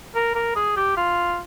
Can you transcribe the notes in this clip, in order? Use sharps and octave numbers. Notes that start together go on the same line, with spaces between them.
A#4
A#4
G#4
G4
F4